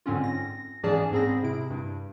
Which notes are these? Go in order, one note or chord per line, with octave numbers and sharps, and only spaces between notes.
G#2 D3 C4 C#4 F4
A#6
G#2 E3 C#4 G#4 D5 A5
G#2 C4 G#4 B5 A#6
C3 E4 D7
G2